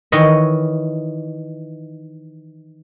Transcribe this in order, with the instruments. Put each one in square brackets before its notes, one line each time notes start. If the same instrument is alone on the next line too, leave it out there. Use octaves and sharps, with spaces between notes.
[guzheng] D#3 E3 C#5 D#5